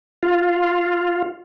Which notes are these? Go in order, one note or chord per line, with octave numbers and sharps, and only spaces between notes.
F4